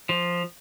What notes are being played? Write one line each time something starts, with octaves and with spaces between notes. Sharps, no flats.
F3